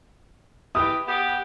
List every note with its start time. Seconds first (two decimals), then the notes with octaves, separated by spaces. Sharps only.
0.75 E3 G4 D#6
1.07 B3 G4